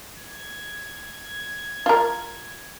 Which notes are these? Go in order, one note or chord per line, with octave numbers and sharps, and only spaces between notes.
G#6
F4 A#4